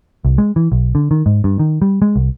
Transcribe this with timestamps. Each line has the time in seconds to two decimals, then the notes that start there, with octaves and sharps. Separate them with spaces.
0.25 C2
0.38 G#3
0.56 E3
0.72 B1
0.95 D3
1.11 D#3
1.26 G#2
1.44 G2
1.59 D#3
1.82 G3
2.02 G#3
2.16 C2